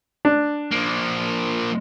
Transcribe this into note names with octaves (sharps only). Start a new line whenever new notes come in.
D4
F3 A#3